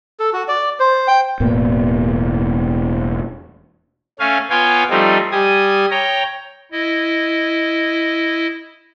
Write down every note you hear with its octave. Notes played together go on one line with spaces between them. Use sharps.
A4
F#4
D5
C5
G5
E1 A2 A#3 B3
A3 C#4 F5 G#5
B3 F4 C#5 F5 G5 G#5
F3 G3 A3 C4 D#4
G3 G4 G#5 D#6
C#5 G5 A#5
E4 D#5